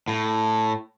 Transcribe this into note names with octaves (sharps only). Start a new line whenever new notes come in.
A2